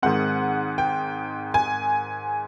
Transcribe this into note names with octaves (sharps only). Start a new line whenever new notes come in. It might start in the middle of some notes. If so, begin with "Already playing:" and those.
G#2 D#3 G#3 C4 F#5
G5
G#5